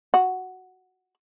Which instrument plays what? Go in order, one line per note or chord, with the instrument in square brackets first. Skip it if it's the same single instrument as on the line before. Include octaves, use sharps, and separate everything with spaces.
[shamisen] F#4